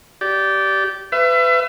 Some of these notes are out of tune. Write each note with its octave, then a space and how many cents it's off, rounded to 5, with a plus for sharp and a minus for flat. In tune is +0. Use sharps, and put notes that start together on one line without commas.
G4 -15 D5 -15
B4 +30 E5 +35